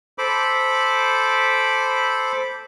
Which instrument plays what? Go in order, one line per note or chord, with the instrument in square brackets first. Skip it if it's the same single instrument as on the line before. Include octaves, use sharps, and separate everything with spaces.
[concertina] A4 C5 B5 D6